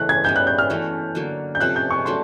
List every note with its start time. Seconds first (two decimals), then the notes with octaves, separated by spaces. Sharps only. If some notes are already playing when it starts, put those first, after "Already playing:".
Already playing: C#3 E3 A3 F#6
0.09 G#6
0.24 G3 B3 D#4 G6
0.36 F#6
0.47 G6
0.59 F6
0.70 E3 A3 C#4 F#4
1.15 D3 F#3 A#3
1.55 G6
1.60 C3 F3 A3 C#4 F#6
1.76 G6
1.91 C#6
2.05 F#3 A3 D4 C6